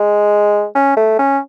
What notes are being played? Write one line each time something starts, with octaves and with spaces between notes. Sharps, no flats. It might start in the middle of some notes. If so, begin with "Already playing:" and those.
Already playing: G#3
C#4
A3
C#4